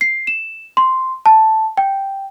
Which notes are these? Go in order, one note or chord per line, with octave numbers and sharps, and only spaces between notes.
C7
E7
C6
A5
G5